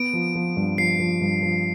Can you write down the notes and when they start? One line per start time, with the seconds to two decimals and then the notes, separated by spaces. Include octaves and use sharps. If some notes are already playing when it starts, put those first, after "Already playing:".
Already playing: B3 D7
0.13 F3
0.35 F3
0.57 G2
0.78 F3 C7
1.00 F3
1.21 G2
1.42 F3